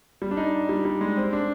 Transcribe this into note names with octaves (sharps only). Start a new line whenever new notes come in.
G3
D4
D#4
G3
G3
G#3
C4
D4